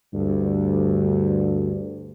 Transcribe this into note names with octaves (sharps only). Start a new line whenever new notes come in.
D2 G2